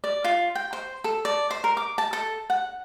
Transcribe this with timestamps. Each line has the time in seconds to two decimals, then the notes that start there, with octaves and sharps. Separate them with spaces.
0.04 D5
0.24 F4
0.55 G5
0.73 C5
1.04 A4
1.25 D5
1.51 C5
1.64 A#4
1.77 D6
1.98 A5
2.13 A4
2.50 F#5